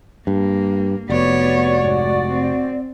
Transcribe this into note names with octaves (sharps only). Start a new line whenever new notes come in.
G2 A#3
F1 B3 F#4 C#5 D5
G#2
C4